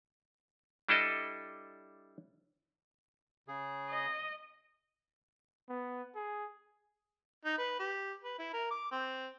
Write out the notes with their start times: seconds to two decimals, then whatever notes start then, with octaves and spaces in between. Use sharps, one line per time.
0.89 G3 D4 E4 A4 D#5
3.48 C#3 G#4
3.90 D#5
5.69 B3
6.15 G#4
7.45 D#4
7.58 B4
7.79 G4
8.24 B4
8.39 E4
8.53 A#4
8.71 D6
8.92 C4